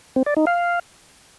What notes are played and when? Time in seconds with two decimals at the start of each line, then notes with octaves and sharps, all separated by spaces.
0.16 C4
0.26 D5
0.37 D#4
0.47 F5